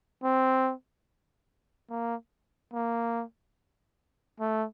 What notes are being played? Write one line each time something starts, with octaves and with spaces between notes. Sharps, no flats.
C4
A#3
A#3
A3